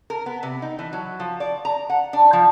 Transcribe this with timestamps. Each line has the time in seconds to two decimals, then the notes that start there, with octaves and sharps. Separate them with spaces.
0.10 A#4
0.26 B3
0.43 C3
0.62 D#4
0.79 E3
0.93 F#3
1.20 F3
1.40 D5
1.65 A#5
1.90 F#5
2.13 D4
2.33 F3